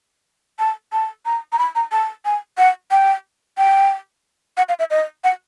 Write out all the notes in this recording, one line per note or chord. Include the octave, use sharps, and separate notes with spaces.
A5
A5
A#5
A#5
B5
A#5
A5
G#5
F#5
G5
G5
F#5
F5
E5
D#5
F#5